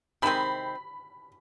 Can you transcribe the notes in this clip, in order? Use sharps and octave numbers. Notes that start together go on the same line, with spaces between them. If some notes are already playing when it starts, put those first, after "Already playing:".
C3 D#3 G#3 C4 B5